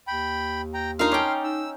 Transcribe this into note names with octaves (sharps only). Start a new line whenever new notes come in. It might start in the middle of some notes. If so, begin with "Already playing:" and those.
D#2 G5 B5
G5 A#5
D4 D#4 F4 A#4 F5 C6 F6
C#4 G5 A5 D6
D#4 E6